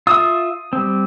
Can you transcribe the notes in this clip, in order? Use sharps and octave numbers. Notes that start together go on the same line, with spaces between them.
F4 E5 D#6
G3 C4